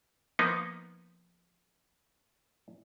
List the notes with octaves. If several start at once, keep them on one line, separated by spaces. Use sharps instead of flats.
F3 A#3 B3 D#4